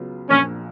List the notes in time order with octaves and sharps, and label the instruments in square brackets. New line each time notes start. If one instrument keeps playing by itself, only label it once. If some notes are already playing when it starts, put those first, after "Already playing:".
Already playing: [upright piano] C#2 C#3 F#3 B3 F4
[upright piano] A#1 A#2 F3 [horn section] C#4